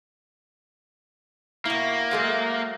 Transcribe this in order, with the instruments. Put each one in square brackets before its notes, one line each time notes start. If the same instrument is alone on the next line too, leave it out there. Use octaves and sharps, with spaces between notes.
[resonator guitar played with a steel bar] B2 E4 [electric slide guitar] A#3
[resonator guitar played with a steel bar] F#3 G#3 A3